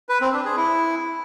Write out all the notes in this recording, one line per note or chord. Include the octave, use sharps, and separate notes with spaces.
B4
C4
D4
G#4
E4